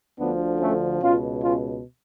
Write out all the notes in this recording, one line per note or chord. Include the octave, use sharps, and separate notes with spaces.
D2 D3 F3 B3 D4
A3 C#4
C#2 B2 C#4 F4
C#4 F4